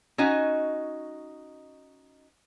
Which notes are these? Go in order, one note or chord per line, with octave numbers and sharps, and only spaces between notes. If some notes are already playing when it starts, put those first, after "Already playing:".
C#4 D#4 F#4 D#5 G#5